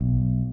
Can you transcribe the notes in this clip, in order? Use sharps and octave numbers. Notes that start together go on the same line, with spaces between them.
B1